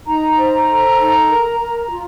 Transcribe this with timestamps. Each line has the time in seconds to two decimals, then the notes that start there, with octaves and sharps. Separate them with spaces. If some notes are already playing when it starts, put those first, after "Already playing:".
0.07 D#4 A#5
0.38 C5
0.69 A4
0.99 D#4
1.30 A#4
1.60 A#4
1.90 F4